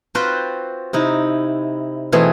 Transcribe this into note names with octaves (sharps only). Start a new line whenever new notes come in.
C4 F4 F#4 B4 C5 G5
C3 D#4 E4
B2 E3 A3 C4 G#4